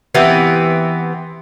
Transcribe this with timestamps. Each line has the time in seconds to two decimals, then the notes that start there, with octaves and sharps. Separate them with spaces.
0.15 E3 B3 C4 G4